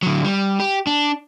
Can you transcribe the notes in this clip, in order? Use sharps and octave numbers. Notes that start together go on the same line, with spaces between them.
D3 F#3
G3
G4
D4